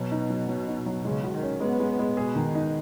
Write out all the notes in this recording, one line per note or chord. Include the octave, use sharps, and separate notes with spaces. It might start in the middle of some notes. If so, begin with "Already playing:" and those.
Already playing: B2 F#3
D#4
F#3
F#3
D#4
F#3
C#3 G#3
F#4
D#3
C#4
G#3 B3
G#3
G#3
B2 G#4
D#3
D#4